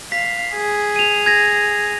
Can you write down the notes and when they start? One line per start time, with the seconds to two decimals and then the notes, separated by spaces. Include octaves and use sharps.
0.12 F5 B6
0.54 G#4
0.96 D#7 F7
1.26 G#6 A#6